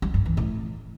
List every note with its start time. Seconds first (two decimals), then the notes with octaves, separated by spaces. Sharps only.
0.02 G3
0.14 G2
0.26 E3
0.37 A2